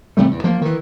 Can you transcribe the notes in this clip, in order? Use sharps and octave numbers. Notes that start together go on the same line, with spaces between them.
G#1 C3 G3 A3
E2
F3 A#3
D#3 E3